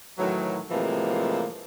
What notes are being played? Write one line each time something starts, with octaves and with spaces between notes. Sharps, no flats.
A2 D#3 E3 F#3
A2 C3 E3 F3 G#3 A#3